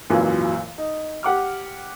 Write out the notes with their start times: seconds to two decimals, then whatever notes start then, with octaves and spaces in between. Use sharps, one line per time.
0.10 G#1 C#2 F#2 A#2 E3 F#3
0.78 D#4
1.23 G4 F#5 D6 F6